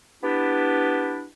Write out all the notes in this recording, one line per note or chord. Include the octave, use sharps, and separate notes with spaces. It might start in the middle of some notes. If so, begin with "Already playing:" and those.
B3 D4 E4 G4